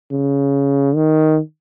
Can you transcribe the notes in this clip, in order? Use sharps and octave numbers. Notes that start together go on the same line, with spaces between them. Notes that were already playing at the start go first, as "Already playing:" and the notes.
C#3
D#3